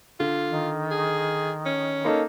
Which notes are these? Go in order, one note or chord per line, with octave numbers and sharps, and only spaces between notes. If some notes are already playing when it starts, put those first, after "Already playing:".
D3 F4
D#3
G#4
C#4
A#3 D#4 A4